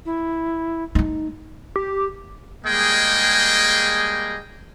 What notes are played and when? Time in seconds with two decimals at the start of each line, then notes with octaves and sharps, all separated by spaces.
0.06 E4
0.95 A3 D#4
1.76 G4
2.65 G3 G#3 A#3 G#4 D#5 G5